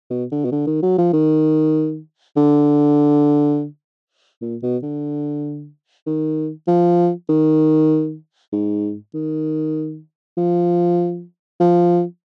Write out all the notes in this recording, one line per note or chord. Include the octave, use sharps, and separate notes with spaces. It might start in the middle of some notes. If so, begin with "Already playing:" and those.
B2
D3
B2
D3
D#3
F#3
F3
D#3
D3
A#2
B2
D3
D#3
F3
D#3
G#2
D#3
F3
F3